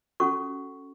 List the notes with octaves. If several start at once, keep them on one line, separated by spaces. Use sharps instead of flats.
C#4 F#4 A4 C#6